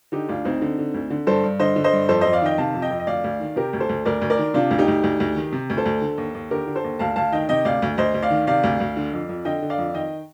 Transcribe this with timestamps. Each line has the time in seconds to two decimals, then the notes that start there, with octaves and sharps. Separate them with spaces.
0.12 D3 D#4 G4
0.29 D2 D4 F4
0.45 D2 C4 D#4
0.62 D3
0.79 D3
0.94 D2
1.10 D3
1.27 G2 A4 C5
1.44 G2
1.60 D3 C5 D#5
1.76 D3
1.84 C5 D#5
1.93 G2
2.09 F2 A4 C5
2.21 F2 C5 D#5
2.33 D5 F5
2.42 D#3 D#5 G5
2.58 C3 F5 A5
2.74 F2
2.82 D#5 G5
2.90 F2
2.99 D#5
3.07 D2 D5 F5
3.24 D2
3.40 D#3
3.56 C3 G4 A#4
3.73 D2
3.80 A4 C5
3.89 D2
4.05 D2 A#4 D5
4.21 D2
4.30 A#4 D5
4.38 D#3
4.54 C3 D4 F4
4.71 D2
4.78 D#4 G4
4.88 D2
5.04 D2
5.20 D2
5.36 D#3
5.53 C3
5.70 D2
5.77 A4 C5
5.85 D2
6.02 D3
6.18 D#2
6.34 D#2
6.51 D3 G4 A#4
6.67 D3
6.76 A4 C5
6.84 D#2
6.99 D2 F5 A5
7.16 D2 F5 A5
7.32 D#3 D#5 G5
7.49 C3 D#5 G5
7.65 D2 D5 F5
7.82 D2
7.98 D2 C5 D#5
8.14 D2
8.23 D5 F5
8.30 D#3
8.47 C3 D5 F5
8.63 D2
8.80 D2
8.97 D3
9.13 F2
9.29 F2
9.45 D3 D#5 G5
9.62 D3
9.70 D5 F5
9.78 F2
9.95 D#3 D#5 G5